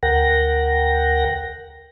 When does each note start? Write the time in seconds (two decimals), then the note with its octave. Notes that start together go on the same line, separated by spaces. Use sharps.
0.03 D2 A#4 F#5 G5 A#6